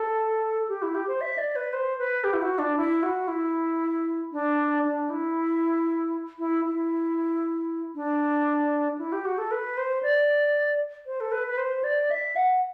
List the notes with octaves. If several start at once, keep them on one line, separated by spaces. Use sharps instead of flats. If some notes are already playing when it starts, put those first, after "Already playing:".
Already playing: A4
G4
E4
G4
C5
E5
D5
B4
C5
B4
G4
E4
F#4
D4
E4
F#4
E4
D4
D4
E4
E4
E4
D4
E4
G4
F#4
A4
B4
C5
D5
C5
A4
B4
B4
C5
D5
E5
F#5